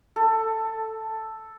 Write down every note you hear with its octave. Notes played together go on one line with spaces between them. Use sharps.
A4